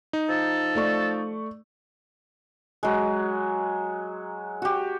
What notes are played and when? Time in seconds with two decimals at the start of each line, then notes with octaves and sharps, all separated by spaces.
0.13 D#4
0.29 F3 A4
0.75 A3 D5 C#6
2.83 F#3 G#3
4.62 F#4 G4